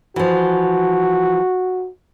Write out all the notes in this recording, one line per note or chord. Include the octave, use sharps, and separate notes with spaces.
E3 F3 F#4